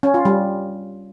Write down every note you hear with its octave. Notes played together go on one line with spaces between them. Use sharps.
C#4
F4
G3